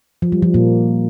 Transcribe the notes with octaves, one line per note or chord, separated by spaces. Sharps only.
F3
G3
F3
A#2 A#3